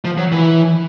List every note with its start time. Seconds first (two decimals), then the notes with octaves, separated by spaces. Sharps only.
0.05 F3
0.18 F#3
0.32 E3